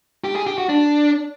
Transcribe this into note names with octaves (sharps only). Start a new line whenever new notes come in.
G4
G#4
G4
F#4
D4